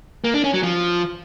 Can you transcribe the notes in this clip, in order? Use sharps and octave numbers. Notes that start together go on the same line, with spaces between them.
A#3
D4
C#4
F#3
F3